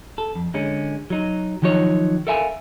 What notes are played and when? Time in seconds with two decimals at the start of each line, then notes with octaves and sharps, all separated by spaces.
0.18 A4
0.35 F2
0.54 D3 G#3 C#4
1.10 F#3 D#4
1.62 D#3 F3 F#3 D#4 C#5
2.27 A4 A#4 E5 F5 G#5